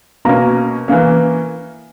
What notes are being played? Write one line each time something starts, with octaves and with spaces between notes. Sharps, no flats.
B2 A#3 C#4 A#5
E3 A#3 C#4